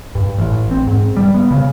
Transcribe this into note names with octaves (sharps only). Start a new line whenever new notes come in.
G2
A1
C4
G#2
G3
B3
C#3